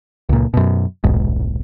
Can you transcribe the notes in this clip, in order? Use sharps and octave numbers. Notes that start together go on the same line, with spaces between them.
C#2 A#2
F#2 B2
D#1 B1 G#2